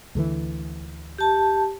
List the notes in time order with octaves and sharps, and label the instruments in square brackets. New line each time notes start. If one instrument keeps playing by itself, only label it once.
[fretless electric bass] D2 D3 E3
[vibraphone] G4 A5